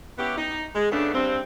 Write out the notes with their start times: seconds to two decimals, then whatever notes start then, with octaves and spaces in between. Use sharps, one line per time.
0.18 B3 C#4 E4 G4
0.38 D#4
0.75 G#3
0.92 C#3 A3 B3 D4
1.14 G2 G3 C4